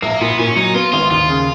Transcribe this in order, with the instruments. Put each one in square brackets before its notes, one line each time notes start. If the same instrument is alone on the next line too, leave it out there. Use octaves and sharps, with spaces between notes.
[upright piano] A#1 [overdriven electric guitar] A#3
[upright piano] A#2 [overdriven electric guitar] B3
[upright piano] A#2 [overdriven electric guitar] C#4
[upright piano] F#3 [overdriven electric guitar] D#4
[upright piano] B3 [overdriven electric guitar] F4
[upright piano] G#1 [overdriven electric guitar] F4
[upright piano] D#2 [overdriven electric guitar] F4
[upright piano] C#3